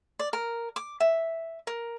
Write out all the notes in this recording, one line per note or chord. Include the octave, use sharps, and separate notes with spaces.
D5
A#4
D6
E5
A#4